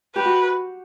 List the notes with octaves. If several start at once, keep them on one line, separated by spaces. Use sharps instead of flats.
G4 B4
F#4